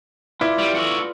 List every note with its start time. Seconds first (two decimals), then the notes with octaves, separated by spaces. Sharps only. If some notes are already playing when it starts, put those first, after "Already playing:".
0.41 E4 F4 B4 D5
0.58 G3
0.75 F#4 A4